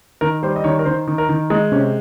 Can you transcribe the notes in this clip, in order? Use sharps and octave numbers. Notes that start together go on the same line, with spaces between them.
D#3 A#4
G3 C5
D#5
D#3 C#5
A#4
D#3 C5
D#3
A#4
D#3
G#3 D#4
C3 C#4